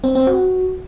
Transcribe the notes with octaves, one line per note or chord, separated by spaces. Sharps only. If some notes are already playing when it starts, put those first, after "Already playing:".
C4
C4
F#4